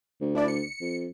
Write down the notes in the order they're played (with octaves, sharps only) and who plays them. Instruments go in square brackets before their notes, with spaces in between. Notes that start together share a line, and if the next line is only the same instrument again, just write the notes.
[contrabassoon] D2
[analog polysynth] D4 E4 D5
C#7
[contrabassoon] F2